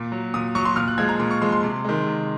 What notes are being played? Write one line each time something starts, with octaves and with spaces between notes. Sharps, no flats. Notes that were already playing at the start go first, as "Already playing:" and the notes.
Already playing: A#2
F#3
A#2 D#6
F#3 C#6
C6
A#2 F6
F#6
F3 G#3 G#6
A#5
A#2 C6
C#6
F3 G#3 C6
C6
C3
D#3 G#3
C3